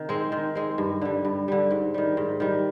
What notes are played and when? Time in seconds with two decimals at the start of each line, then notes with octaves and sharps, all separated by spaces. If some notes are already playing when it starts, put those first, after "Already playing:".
Already playing: C3 D#3
0.09 G#3 C4
0.32 D#3
0.55 G#3 C4
0.78 G2
1.01 D3 G3
1.25 G2
1.48 D3 G3
1.71 G#2
1.94 D#3 G3
2.17 G#2
2.40 D#3 G3